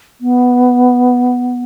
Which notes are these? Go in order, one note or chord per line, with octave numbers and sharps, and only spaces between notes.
B3